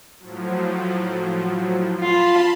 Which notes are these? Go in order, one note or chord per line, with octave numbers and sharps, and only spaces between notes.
A2 F3 F#3
F4 A5 B5 C6